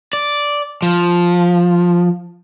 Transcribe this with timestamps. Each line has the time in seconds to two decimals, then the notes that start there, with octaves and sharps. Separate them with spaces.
0.13 D5
0.82 F3